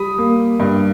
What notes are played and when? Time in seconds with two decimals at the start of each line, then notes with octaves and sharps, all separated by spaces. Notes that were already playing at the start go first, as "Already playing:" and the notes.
Already playing: G3 B5 D#6
0.18 A#3
0.60 G2